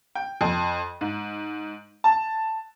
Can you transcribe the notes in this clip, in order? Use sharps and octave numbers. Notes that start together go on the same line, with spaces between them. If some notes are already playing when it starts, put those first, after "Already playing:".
G5
F2
G#2
A5